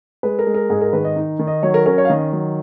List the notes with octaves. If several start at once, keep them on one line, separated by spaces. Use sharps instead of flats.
G#3 B4
A#4
G#3
A#4
G#2 G#4
A#4
D#3 B4
D#5
D#4
D#3
D#5
F#3 C#5
A#4
C#4 A#4
C#5
F5
D#3 D#5
F#3